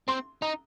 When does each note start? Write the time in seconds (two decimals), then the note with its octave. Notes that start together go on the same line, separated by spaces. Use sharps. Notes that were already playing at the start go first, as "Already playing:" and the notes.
0.08 C4 C6
0.42 D#4 A#5